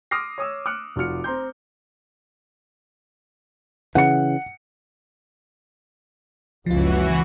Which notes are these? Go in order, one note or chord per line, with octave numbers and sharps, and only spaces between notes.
C6 D6 D#6 F6 A#6 C7
C#5 D#6 E6
D6 F6 F#6 C#7
F1 F4 F#4 F6 C#7
C4 A#5 C6 G6
C#3 E3 F#5 C#7
F#1 C#2 C#3 E3 F3 F4 F#4